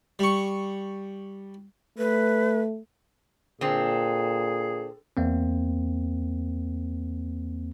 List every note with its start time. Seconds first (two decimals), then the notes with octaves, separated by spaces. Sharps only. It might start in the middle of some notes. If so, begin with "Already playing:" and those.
0.19 G3 C#6
1.98 A3 B4
3.61 A#2 D3 C4 G#4
5.17 E2 A#3 C4